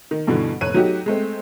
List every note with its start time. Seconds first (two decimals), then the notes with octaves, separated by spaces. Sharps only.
0.11 D#3
0.27 G2 B2 D3 E3 D#4
0.61 F1 A2 C#5 F#6 D#7
0.74 F#3 A3 D#4 F#4 G4
1.06 G#3 A3 C4